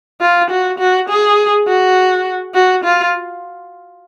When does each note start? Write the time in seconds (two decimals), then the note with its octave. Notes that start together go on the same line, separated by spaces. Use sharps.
0.21 F4
0.50 F#4
0.79 F#4
1.09 G#4
1.67 F#4
2.54 F#4
2.84 F4